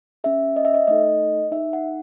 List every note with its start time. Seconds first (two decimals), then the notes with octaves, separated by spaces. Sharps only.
0.24 C#4 G#4 E5
0.56 D#5
0.65 E5
0.74 D#5
0.87 A3 D#4 A4 D#5
1.52 D#4 G#4 E5
1.73 F#5